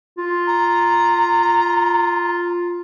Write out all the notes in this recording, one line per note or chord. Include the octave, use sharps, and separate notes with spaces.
F4
A#5